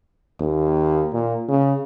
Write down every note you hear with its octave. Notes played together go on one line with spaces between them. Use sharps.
D#2
A#2
C#3